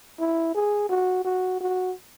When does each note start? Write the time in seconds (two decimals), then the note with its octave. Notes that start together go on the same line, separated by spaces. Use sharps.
0.20 E4
0.55 G#4
0.89 F#4
1.25 F#4
1.60 F#4